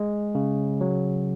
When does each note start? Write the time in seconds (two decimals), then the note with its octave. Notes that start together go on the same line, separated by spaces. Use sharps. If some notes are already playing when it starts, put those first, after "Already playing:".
Already playing: G#3
0.35 C#3
0.81 F#3